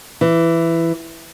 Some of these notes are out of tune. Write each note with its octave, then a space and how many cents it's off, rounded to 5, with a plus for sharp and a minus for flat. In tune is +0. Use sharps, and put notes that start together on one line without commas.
E3 +10